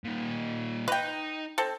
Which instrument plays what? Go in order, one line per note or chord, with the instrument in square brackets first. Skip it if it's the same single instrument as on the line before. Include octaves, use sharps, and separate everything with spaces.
[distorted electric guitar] A#2 D#4
[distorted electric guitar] D#4 [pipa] B4 G5
[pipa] C4 A4